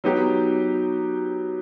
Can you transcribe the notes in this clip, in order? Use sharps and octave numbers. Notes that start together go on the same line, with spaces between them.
F#3 B3 D#4 G4